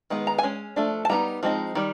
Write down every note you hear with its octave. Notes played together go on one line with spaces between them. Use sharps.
D#3 G#3 B3
A#5
G#5
G#3 C#4
F3 A3 D4
A5
G3 B3 D#4 A#5
F3 G#3 C4 D#4
D#3 G3